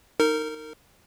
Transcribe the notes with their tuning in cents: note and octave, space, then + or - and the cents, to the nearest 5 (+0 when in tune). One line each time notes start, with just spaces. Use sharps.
D#4 +5 A#4 -25